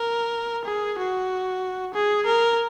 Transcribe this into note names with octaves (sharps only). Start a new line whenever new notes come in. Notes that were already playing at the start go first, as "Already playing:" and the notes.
Already playing: A#4
G#4
F#4
G#4
A#4